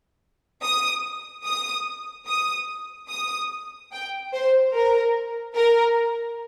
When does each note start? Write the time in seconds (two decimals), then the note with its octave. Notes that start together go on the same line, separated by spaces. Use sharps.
0.62 D#6
1.45 D#6
2.27 D#6
3.10 D#6
3.92 G5
4.33 C5
4.74 A#4
5.56 A#4